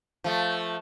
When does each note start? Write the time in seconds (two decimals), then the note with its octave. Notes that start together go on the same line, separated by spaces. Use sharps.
0.24 F3 A3